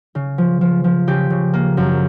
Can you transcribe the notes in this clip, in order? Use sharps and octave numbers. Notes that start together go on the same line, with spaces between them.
C#3
F3
F3
F3
C#3 G4
C#3
A#3
F#2